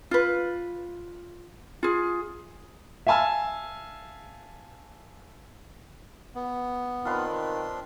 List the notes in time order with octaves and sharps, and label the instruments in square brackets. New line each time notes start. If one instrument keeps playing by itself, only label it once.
[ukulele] F4 B4
F4 G#4
[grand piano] E5 F5 G#5 A5 E6 F6
[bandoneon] B3
[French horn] D#3 [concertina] C4 D4 C6 [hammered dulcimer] F4 B4 F5